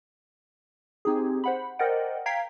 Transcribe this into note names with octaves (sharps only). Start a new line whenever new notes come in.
C4 D#4 G4 G#4
C5 F#5 B5
A#4 C5 D5 D#5 F#5 G5
F5 G5 A#5 G#6 B6 C7